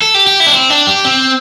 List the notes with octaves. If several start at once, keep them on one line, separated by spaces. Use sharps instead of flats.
A4
G4
G4
E4
D4
C4
D4
G4
C4